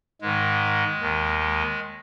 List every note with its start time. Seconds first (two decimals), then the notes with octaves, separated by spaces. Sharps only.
0.21 G#2 D#3 G#3
1.00 D#2 D#3
1.39 G#3